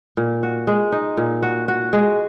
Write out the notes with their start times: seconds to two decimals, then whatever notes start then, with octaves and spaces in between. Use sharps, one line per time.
0.17 A#2
0.43 F#4
0.67 G#3
0.92 D#4
1.17 A#2
1.42 F#4
1.68 F#4
1.93 G#3